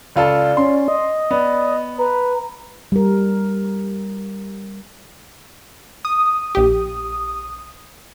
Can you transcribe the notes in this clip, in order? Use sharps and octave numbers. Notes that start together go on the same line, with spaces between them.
C#2 F4 A4 D5
C#4 C6
D#5
B3 D5
B4 A#5
G3 A#4
D#6
A#1 G4